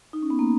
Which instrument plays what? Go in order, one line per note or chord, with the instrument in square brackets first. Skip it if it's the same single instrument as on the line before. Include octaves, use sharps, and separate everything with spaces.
[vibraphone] D#4
C#4
B3
A#3